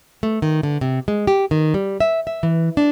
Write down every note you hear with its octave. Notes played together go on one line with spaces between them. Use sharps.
A3
D#3
D3
C3
G#3
G4
D#3
G3
E5
E5
E3
D4